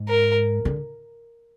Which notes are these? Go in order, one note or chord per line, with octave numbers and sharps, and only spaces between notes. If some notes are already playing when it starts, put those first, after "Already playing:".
Already playing: G#2
A#4
D3